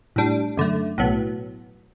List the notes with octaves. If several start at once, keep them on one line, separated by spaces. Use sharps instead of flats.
A2 G3 D4
F#2 D3 A3
B1 A2 F#3 B3